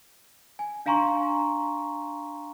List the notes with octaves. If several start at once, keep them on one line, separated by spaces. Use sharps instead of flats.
G#5
D4 F5 G#5 A#5 C6 C#6